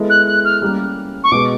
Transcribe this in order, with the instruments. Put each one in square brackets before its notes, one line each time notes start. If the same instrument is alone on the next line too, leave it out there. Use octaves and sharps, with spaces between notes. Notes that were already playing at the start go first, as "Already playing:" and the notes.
Already playing: [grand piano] G#3 B3 E4 A4
[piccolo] F#6
F#6
F6
[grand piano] G3 A#3 C#4
[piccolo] C#6
[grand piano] B2 G#3 B3 [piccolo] D6